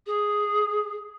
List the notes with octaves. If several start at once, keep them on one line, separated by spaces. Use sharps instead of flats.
G#4